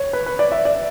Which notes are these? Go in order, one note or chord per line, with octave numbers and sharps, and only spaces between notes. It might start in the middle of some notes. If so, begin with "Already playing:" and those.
Already playing: C#5
B4
B4
D5
E5
D5